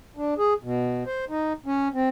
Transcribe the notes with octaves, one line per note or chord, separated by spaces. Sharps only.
D4
G#4
B2
C5
D#4
C#4
C4